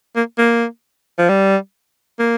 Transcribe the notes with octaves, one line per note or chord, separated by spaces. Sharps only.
A#3
A#3
F3
G3
A#3